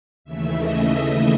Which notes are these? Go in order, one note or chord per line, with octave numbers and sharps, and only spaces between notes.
D#2 C#3 E3 A3 E5
D#5